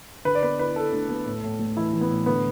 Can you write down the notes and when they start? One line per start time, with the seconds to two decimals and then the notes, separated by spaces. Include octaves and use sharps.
0.25 D3 B4
0.35 D5
0.43 B3 B4
0.59 E4 B4
0.76 E4 A4
0.92 D2
1.09 B3
1.26 A2
1.43 A2
1.59 A3
1.77 E3 E4
1.93 E3
2.01 B3
2.10 A2
2.26 D3 B3